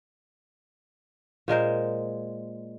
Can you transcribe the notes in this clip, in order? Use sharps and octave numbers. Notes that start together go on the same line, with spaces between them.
A#2 G#3 A#4 C5